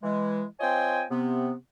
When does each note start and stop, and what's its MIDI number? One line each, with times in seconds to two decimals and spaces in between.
0.03 0.44 52
0.03 0.44 56
0.60 1.04 60
0.60 1.04 65
0.60 1.04 73
0.60 1.04 75
0.60 1.04 79
0.60 1.04 80
1.11 1.52 48
1.11 1.52 59